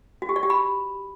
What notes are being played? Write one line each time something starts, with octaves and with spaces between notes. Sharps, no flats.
F#4
G4
D5
G4
B5